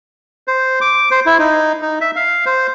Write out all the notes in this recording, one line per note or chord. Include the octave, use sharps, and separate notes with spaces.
C5
D6
C5
E4
D#4
D#4
E5
F5
C5